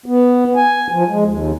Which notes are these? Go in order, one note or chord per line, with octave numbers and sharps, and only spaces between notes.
B3
G#5
F3
G#3
D#2